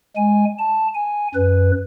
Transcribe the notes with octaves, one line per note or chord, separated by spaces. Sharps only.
G#3 G#5
A5
G#5
F#2 B4